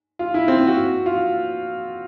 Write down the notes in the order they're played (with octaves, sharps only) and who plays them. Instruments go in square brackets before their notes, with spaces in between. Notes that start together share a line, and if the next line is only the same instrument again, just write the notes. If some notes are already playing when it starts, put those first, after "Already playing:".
[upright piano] F4
E4
C4
F#4
F4